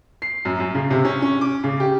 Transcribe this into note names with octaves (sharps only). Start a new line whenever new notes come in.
C7
F#2
F#2
C#3
C3
C#4
C#4
D6
C#3
G4